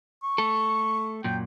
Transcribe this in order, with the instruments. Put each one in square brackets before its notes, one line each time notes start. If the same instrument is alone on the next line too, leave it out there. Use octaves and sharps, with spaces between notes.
[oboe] C#6
[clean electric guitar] A3 A4
[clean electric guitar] F#2 A#2 [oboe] G5